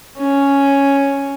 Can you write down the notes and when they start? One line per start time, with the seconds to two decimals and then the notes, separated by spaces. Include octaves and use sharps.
0.18 C#4